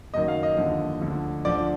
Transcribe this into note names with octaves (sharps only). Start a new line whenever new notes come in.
F#1 F#2 D#3 D#5
F5
D#5
D#2 D3 F3
D2 D3 F3
D2 D3 F3 D5